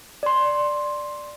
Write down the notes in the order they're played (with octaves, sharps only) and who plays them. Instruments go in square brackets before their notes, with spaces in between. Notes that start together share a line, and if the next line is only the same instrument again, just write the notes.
[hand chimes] D5 C6